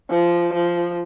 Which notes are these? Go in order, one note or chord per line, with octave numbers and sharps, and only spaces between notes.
F3
F3